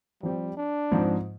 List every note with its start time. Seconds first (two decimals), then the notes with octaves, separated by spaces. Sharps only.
0.23 F3 G3 C4 G4
0.57 D4
0.92 G#2 F3 C4 D#4